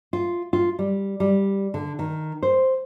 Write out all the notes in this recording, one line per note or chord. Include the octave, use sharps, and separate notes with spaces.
F4
F4
G3
G3
D3
D#3
C5